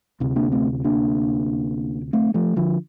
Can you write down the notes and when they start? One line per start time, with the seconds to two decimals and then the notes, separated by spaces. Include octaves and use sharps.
0.20 D2 C3
0.36 A#3 D4
0.52 A3 C4
0.84 A#3 D4
2.13 A3 C4
2.34 F3 A3
2.56 D3 F3